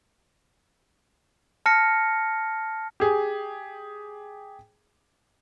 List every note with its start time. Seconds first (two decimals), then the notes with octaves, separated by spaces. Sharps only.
1.66 A5 F6 A#6 C#7
3.00 G4 G#4